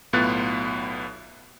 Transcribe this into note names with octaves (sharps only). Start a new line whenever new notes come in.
B1 A2 B3 F4 F#6 A6